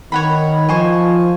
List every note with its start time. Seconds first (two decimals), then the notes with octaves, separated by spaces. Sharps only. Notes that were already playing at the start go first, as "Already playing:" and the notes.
0.12 D#3 C#5 F#5 B5
0.69 F3 C5 D#5 G#5 C#6